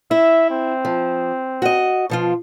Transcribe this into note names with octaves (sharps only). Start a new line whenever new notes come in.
E4 E5
C4
F3
F#4 D#5
B2 F3 F4